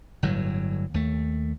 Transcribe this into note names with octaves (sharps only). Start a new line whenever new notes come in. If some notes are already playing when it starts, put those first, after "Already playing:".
G1 A2 F#3
D#2 A3